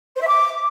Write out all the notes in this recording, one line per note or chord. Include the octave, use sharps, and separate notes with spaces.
C5
E5
D6